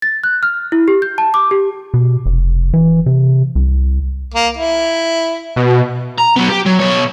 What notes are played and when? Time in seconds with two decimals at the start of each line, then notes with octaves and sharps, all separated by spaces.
0.02 A6
0.24 F#6
0.43 F6
0.72 E4
0.88 G4
1.02 G6
1.18 A5
1.34 D6
1.51 G4
1.94 B2
2.26 F1
2.74 E3
3.06 C3
3.55 C2
4.34 A#3
4.57 E4
5.56 B2
6.18 A#5
6.37 F#3 B3
6.49 G4
6.66 F#3
6.80 B2 C#5